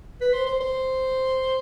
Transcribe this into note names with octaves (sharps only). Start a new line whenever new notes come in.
B4
C5
C5
C5